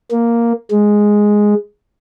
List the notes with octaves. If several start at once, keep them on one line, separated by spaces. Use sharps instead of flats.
A#3
G#3